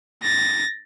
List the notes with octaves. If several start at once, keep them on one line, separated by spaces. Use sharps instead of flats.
A6 A#6